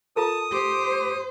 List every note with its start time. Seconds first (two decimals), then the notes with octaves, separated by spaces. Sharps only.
0.16 F4 A4 A#4 A5 D#6
0.52 G4 C5